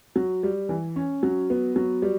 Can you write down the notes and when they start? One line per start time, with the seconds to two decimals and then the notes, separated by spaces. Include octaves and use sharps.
0.16 F#3
0.43 G3
0.69 E3
0.96 C#4
1.23 F#3
1.50 B3
1.76 F#3
2.02 G3